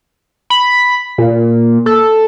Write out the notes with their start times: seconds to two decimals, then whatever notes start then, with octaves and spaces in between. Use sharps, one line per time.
0.50 B5
1.18 A#2
1.86 A4